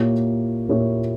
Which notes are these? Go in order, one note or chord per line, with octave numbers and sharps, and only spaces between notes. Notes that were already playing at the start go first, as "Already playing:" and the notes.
Already playing: A#2 A#3 E4 G4 C#5
A#2 A#3 E4 G4 C#5